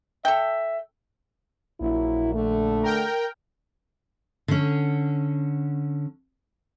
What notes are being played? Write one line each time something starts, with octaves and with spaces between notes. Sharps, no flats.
A4 E5 G5
A#1 F#3 A#3 E4
D3 A3
A#4 G5
D3 C#4